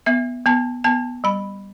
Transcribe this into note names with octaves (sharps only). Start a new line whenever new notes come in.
B3 E5
B3 A5
B3 A5
G3 B5